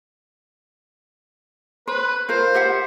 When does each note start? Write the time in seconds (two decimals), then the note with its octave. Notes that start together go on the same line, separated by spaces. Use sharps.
1.88 B4 C5
2.29 F4 A#4 C5 F5
2.54 G4 E5 F#5